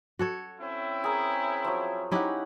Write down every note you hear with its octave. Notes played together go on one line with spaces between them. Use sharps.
F#4 A4 C#5
C4 C#4 E4
G#4 A#4
F3 F#3
C#4 D#4 E4 G4 F#5